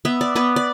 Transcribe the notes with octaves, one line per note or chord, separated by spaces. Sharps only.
B3 E5
D5
B3 B4
D5